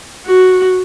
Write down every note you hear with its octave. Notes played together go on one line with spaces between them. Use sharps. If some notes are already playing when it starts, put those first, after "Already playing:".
F#4